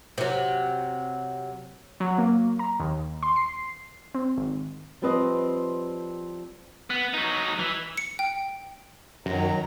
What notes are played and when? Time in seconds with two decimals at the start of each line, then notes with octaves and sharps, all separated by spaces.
0.18 C3 F#3
2.00 F#3
2.18 A#3
2.59 A#5
2.80 D#2
3.23 C6
3.36 C7
4.14 C4
4.38 G#1
5.02 F3 G3 C4 B4 C5 D#5
6.90 B3
7.14 F#3 D#4
7.59 E3
7.97 C#7
8.19 G5
9.26 F#2 D#3 F#3 A#5